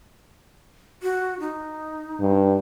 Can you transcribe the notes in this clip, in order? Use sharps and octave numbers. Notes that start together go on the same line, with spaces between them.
F#4
D#4
G2